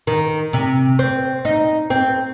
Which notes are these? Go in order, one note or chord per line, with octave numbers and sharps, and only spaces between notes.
D#3
C3
C4
D#4
C4